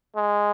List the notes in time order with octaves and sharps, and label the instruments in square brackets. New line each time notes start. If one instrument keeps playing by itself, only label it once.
[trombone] G#3